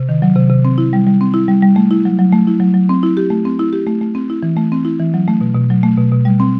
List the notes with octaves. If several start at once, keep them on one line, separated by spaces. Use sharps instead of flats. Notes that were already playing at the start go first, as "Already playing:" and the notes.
Already playing: C3
D#3
F#3
C3
C3
C4
E4
G3
G3
C4
E4
G3
G3
A3
E4
F#3
F#3
A3
E4
F#3
F#3
C4
E4
G4
A3
C4
E4
G4
A3
A3
C4
E4
E3
A3
C4
E4
E3
F#3
A3
B2
B2
F#3
A3
B2
B2
G3
C4